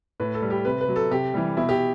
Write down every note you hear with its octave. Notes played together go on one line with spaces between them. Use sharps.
A2 B4
A4
G3
G4
C3 B4
B4
F#3
A4
C3 G4
E3 G3
B2 E4
G4